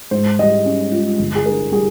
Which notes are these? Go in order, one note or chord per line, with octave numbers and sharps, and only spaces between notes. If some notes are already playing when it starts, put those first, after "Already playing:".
G#2 C5
G3 D#5
C#4
F4
G1
G#4
G2 A#4
G3 G#4